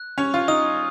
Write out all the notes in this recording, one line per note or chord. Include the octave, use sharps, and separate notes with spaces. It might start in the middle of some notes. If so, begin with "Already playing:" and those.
Already playing: F#6
C#4 F7
F4
D#4 D#6